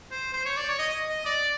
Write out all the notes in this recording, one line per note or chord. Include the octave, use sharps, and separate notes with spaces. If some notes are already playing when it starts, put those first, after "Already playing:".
C5
C5
C#5
D5
C#5
D#5
D#5
D5